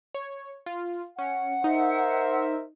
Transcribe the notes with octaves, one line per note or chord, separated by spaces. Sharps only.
C#5
F4
C#4 F#5
D#4 A#4 C5 E5